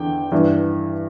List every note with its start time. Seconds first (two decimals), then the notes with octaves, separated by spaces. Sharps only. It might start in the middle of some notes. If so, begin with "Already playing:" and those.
Already playing: E2 D3 G5
0.32 G2 E3